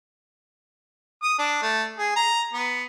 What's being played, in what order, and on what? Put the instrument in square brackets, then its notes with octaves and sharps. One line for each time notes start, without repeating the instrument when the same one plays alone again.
[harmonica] D#6
D4
A3
G#4
A#5
B3